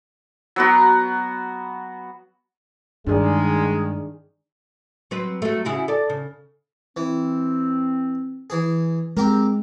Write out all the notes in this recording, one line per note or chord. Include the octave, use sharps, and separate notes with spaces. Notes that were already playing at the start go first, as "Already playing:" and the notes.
F#3 B3 F#4
G2 D#3 G#3 D4 G#4 D5
F#3 C4 B4
F#3 A3
C#3 E4 F#4
A4 D5
C#3
E3 C4
E3 G#4
G#3 C4 G4 A#4